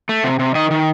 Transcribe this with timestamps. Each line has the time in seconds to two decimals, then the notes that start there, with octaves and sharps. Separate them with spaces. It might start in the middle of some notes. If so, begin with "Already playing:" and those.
0.09 A3
0.24 C3
0.39 C3
0.55 D#3 D#5
0.71 D#3